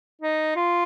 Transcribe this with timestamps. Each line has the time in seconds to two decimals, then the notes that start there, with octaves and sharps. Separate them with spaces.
0.21 D#4
0.56 F4